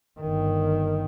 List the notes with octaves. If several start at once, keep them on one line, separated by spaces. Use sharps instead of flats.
G1 D#3